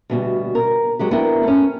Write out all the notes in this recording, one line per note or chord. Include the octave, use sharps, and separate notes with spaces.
D2 B2 G3
A#4
F#3 G#3 G4
B3 D4 E4 A#4 G5
A3 C#4